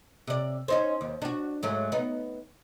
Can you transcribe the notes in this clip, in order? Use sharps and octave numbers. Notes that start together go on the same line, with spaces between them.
C3 D5
C#4 D#4 C5
D#2
D4 F#4
G#2 F#3 A3
B3 D#4